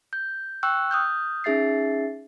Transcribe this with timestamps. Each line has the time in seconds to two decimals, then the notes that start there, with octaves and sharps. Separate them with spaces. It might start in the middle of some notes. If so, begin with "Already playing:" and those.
0.13 G6
0.63 G5 C#6 E6 F#6
0.91 D#6 F6 G6
1.44 C#4 D#4 G#4 E5 A6 C7